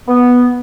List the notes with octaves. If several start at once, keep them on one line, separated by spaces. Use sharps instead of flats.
B3